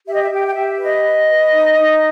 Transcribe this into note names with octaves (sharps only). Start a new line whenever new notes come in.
G4 E5
D#5
E5
G4 G5
G5
G4 E5
B4 D#5
B4
B4
D#4
D#4